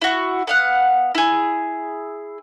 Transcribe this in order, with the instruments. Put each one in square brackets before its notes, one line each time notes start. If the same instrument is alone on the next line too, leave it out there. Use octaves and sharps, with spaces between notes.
[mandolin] E4 F#4
B3 F5 F#5
E4 G#4